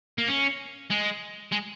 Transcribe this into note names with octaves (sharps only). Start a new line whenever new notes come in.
A#3
C#4
G#3
G#3